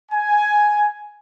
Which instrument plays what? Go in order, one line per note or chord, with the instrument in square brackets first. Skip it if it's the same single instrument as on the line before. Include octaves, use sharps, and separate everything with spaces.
[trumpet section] G#5